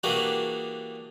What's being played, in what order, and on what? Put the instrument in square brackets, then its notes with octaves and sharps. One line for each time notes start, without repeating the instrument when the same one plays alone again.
[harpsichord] E3 G3 A#3 D4 F#4 G#4